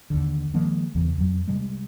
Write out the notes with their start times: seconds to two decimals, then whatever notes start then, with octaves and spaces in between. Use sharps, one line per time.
0.10 D#2 D3
0.54 D#3 F3 G#3 A#3
0.95 E2 C#3 E3
1.18 F2 F#3
1.48 C3 G3 G#3